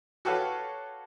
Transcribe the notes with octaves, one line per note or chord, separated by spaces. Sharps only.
F#4 G4 A4 B4 C#5 F5